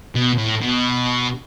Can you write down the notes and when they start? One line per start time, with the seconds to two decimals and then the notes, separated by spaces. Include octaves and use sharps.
0.15 B2
0.38 A2
0.62 B2